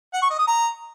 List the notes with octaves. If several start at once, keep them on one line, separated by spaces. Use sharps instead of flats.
F#5
C#6
D#5
D#6
A#5